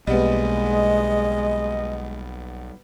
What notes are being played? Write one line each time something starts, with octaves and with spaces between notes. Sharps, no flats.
B1 G3 G#3 A#3 B3 D#5